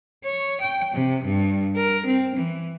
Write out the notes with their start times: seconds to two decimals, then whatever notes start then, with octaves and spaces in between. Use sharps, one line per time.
0.24 C#5
0.61 G5
0.94 C3
1.23 G2
1.76 A#4
2.06 C4
2.36 E3